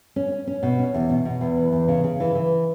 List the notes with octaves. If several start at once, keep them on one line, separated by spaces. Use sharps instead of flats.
C#4
C#4
C#4
B2
C#4
E2
B2
B2
E2
E3
E2
C#3
C#3
E3
E3